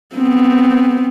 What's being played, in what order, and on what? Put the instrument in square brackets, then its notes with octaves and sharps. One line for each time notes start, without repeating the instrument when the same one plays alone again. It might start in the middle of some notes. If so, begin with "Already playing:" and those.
[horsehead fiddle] B3 C4